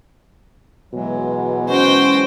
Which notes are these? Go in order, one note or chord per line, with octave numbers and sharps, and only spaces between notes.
B2 E3 F#3 G#3
C#4 F#4 C5 G5